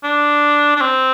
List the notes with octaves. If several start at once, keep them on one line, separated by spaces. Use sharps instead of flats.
D4
D4
C4